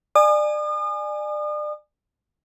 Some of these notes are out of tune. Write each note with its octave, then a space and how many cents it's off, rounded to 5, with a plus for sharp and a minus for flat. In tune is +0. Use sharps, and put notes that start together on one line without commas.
D5 +30 G#5 -5 D#6 -40